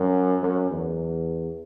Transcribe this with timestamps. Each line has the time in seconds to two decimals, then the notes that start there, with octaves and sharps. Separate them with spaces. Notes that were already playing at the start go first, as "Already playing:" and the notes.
Already playing: F#2
0.43 F#2
0.71 E2